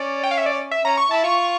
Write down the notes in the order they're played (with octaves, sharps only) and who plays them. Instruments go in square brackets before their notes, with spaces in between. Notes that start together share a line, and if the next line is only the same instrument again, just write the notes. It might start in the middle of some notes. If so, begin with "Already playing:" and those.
Already playing: [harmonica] C#4 [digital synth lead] D5
[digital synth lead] G5
F5
E5
D5
E5
[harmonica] C#4 [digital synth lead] A#5
[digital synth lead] C#6
[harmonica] E4 [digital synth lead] A5
[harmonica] F4 [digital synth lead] C#6